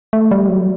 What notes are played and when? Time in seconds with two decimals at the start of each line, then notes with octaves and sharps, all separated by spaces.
0.13 A3
0.31 G3
0.48 F#3